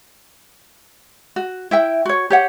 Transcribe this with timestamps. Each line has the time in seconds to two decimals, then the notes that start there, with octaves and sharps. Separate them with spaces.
1.36 F#4
1.71 E4 E5 G5
2.05 F#4 C#5
2.30 G4 C#5 F#5